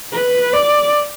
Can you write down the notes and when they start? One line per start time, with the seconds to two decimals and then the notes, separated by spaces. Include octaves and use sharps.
0.12 B4
0.53 D5